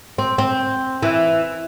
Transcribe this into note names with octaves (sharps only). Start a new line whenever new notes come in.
C4
C4
E3